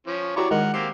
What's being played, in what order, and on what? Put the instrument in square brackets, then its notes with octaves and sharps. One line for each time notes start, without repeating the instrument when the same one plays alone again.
[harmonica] F3 C#4
[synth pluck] E4 F#4 G4 [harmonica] C#5 D5 A#5
[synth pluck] D#3 G#3 [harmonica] A#4 F#5
[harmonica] A#3 C4 G4 [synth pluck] C7